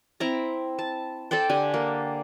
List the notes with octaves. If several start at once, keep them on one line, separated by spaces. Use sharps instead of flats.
C4 E4 A#5
A5
A4 C5 D5 G5
D3 G4 G#5
A#3